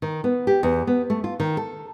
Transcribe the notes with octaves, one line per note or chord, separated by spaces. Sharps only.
D#3
B3
G4
E2
B3
A3
F4
D#3
A4